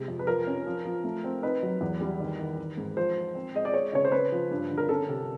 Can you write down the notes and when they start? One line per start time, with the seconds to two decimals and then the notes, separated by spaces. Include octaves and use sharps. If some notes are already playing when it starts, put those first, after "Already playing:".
Already playing: C3 G#3
0.08 F2
0.19 B4
0.27 F3 A#4
0.47 C#4
0.66 F3
0.85 F3
1.04 A3
1.24 C4
1.43 D#4 B4
1.63 F#3
1.81 E2
2.01 G3
2.20 D#3
2.39 D#3
2.58 D#3
2.77 G#2
2.97 F3 C5
3.15 F3
3.35 C4
3.55 G#3 D#5
3.65 D5
3.74 G#3 C#5
3.93 C#3 C#5
4.05 C5
4.12 C#4 B4
4.32 F3
4.51 G2
4.70 D3
4.77 A#4
4.89 C#4 A4
5.09 C3